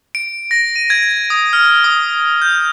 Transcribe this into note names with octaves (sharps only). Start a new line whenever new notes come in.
D7
A#6
D#7
G#6
D#6
F6
D#6
G6